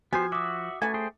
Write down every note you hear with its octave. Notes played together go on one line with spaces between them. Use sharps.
F3 B3 F#4 G4 C5 G#5
F#4 E5 D6 D#6
A3 C#4 F#4 B4 G#5
G#4 C5 G5